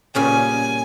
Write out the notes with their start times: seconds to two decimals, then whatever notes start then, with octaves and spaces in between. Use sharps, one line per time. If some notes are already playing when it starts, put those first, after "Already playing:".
0.15 A#2 C#3 G3 G#5